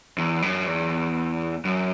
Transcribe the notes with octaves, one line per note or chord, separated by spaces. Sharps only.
E2
F#2
E2
F#2